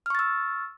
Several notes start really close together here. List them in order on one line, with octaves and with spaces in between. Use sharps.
F6 C#6 A6 E6